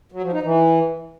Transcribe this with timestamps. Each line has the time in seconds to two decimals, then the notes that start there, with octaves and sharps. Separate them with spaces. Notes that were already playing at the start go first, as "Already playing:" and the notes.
0.12 F#3
0.22 F3
0.32 D#4
0.43 E3